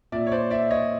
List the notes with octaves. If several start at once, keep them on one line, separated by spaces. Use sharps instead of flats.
A#2 D5 E5
C#5
C5 D5
D5 E5
C#5 D#5